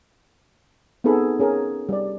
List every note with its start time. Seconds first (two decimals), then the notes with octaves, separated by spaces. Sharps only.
1.04 B3 C4 D#4 G#4 A4 B5
1.40 C#4 G#4 A#4
1.89 G3 D5